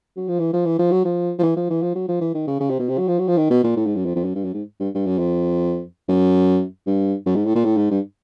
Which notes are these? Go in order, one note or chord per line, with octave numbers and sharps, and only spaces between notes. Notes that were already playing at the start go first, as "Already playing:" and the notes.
F#3
F3
E3
F3
E3
F3
F#3
F3
F3
E3
F3
E3
F3
F#3
F3
E3
D#3
C#3
C#3
C3
B2
C3
F#3
F3
F#3
F3
D#3
B2
A#2
A2
G#2
F#2
F2
F2
F#2
G2
F#2
G#2
G2
G2
F#2
F2
F#2
G2
F#2
G#2
A2
A#2
A2
G#2
G2